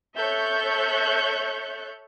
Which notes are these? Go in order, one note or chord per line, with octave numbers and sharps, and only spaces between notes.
A4 C#5 E5 C#6 F#6 G6